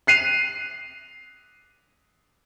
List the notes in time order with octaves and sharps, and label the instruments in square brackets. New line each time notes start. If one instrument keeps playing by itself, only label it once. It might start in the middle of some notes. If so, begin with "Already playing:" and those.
[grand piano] F#6 C7 D#7 F7